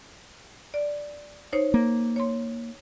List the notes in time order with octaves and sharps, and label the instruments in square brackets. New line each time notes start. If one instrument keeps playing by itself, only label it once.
[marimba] D5
D#4 C5 C#5
[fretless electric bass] A#3
[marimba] C#5 C6